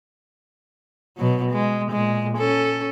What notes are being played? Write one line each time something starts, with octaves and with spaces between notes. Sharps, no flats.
B2 F#3
G#3
A#2 G#3
C#4 A4